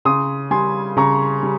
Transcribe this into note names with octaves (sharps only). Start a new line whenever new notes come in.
C#3 C6 D#6
G3 G#5 C6
C#3 A#5 C#6
G3